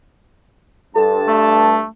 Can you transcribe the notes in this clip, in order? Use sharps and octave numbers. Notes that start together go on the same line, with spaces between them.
G2 A4 A5
A3